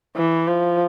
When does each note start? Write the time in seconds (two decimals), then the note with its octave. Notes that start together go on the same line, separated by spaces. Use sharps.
0.16 E3
0.48 F3